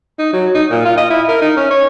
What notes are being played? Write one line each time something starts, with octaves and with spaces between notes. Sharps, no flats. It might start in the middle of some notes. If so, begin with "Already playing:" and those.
D#4
F#3
D#4
A#2
F4
D#5
E4
A#4
D#4
C#4
C#5